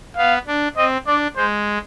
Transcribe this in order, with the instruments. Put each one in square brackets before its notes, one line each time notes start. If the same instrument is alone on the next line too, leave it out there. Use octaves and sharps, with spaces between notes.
[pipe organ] B3 [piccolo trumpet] F5
[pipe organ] D4
[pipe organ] C4 [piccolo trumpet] D#5
[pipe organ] D4 [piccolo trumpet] D5
[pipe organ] G#3 [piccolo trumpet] C5